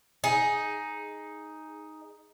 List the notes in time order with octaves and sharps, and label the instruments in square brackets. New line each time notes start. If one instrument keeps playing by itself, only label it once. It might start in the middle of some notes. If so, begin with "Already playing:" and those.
[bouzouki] D#4 G#4